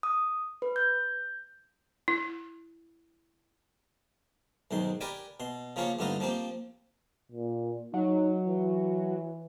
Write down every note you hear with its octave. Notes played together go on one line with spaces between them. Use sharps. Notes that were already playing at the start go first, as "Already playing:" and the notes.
D#6
B4
G6
E4
B1 G#2 D#3 C6
G4 A#4 B4 D5 G#5
B2 C6
C#3 F3 A#3 F4 G#4 C#5
D2 G2 B3 D#4 F4 D#5
F3 A#3 C4 G4
A#2
F#3 D#4
E3